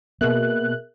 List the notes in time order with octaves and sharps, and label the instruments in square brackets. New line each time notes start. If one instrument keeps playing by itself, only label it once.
[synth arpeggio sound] B2 F#6 [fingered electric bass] A#3 [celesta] G#4 A#4 E5